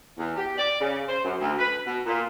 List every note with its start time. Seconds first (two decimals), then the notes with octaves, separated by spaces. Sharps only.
0.18 E2
0.37 G4
0.58 D5
0.80 C#3
1.09 C5
1.25 F#2
1.40 D2
1.59 B4
1.86 B2
2.06 A#2